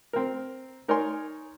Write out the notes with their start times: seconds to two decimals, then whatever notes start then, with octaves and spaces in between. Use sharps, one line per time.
0.13 C4 A#4
0.88 D#4 A#4 C#5 D5 G#5 C6